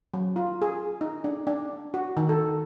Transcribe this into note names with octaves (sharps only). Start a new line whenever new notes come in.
F#3
F4
G#4
D#4
D4
D4
F#4
D#3
A4